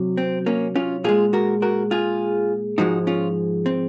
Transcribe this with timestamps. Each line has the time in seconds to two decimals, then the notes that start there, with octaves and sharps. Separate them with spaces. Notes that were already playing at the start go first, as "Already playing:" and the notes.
Already playing: C3 F#3
0.17 C4
0.46 A#3 C#4
0.76 C#4 F4
1.04 A#2 G#3 F4 G#4
1.33 F#4 A#4
1.62 F#4 A#4
1.91 F4 G#4
2.78 G#2 F3 G#3 D#4 F#4
3.07 C#4 F4
3.66 C4